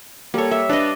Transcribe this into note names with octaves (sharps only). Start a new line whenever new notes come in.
G3 A#3 A4 C#5
E5
D4 B4 D5 D#5